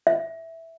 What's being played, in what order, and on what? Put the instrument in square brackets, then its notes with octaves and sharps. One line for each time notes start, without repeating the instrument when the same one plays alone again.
[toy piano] E5